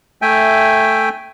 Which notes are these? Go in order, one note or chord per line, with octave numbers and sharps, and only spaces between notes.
A3 E5 G5 G#5